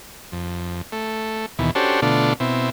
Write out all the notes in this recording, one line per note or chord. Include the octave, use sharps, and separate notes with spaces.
F2
A3
D#2 B2 E3
C#4 D4 F#4 G4 A4 C5
B2 D3 A3 D4 F4
B2 C4 E4